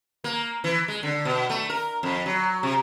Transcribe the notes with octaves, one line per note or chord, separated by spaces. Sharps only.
A#3
E3
G#3
D3
B2
A3
A#4
F2
F#3
C3